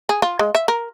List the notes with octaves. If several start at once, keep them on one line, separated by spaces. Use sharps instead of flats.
G#4
F4
G#3
E5
A#4